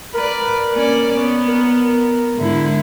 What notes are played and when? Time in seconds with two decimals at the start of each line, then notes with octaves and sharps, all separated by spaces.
0.14 A#4 B4 D5
0.73 A#3 C#4 D5
1.16 B3 C#4
1.48 A#4
2.36 G#2 D3 E4